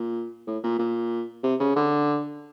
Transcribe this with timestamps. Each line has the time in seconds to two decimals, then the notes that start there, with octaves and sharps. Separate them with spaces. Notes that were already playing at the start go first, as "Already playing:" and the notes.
Already playing: A#2
0.47 A2
0.64 A#2
0.79 A#2
1.44 C3
1.60 C#3
1.76 D3